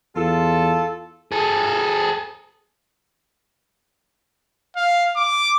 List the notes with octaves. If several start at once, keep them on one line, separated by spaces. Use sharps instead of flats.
E2 F4 A4
G#4 A4
F5
D6